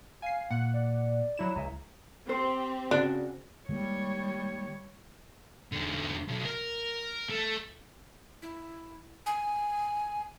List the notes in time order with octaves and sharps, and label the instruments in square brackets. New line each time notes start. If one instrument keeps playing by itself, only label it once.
[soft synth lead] F5 [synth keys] G#5 C7
[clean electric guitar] A#2 [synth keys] F#5
[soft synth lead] D5
[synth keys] F#3 E4 E7
[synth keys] C#2 [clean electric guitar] E5 G#5 A#5
[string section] C4 G4 [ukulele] C5
[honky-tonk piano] C#3 [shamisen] D4 [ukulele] F#4
[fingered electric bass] D#3 G#3 A#3 [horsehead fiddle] G3 C#5
[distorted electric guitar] E2 D3
B1
A#4
A3
[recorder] E4
G#5